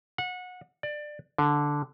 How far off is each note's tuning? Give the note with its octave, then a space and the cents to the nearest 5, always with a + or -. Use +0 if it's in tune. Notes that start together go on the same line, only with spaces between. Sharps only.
F#5 -25
D5 +20
D3 -5